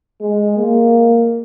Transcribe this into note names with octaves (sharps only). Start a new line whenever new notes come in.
G#3
A#3